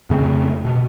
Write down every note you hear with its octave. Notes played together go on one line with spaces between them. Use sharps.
F2 C#3 A3 C4
B2